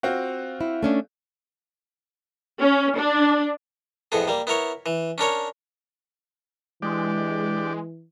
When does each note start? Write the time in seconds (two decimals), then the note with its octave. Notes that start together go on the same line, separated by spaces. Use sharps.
0.03 C4 F4 F#4
0.61 E4
0.83 A3 C#4 D4
2.60 C#4
2.96 D4
4.12 F2 A2 B3 G#4
4.28 G3 A#3
4.47 B3 E4 A#4 C#5
4.86 E3
5.18 C#4 D4 A#4 C#5
6.82 E3 G#3 D4 G4 D5